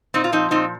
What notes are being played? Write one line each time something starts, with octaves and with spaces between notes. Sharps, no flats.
A#2 C4 D#4
F4
F3 C4 D#4
A#2 C4 D#4